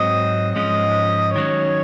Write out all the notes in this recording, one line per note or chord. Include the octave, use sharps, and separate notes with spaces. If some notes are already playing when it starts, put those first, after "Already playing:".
Already playing: G#2 F#3 C4 D#5
G#2 F3 G#3 C#4 D#5
D#3 F#3 C#4 C#5